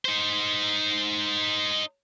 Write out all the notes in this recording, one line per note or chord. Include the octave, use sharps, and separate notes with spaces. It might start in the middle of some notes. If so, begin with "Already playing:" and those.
D#4 C5